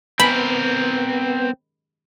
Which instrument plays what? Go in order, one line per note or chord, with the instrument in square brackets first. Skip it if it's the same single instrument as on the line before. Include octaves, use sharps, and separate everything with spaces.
[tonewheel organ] B3 [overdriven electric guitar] C4 A#4 [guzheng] B5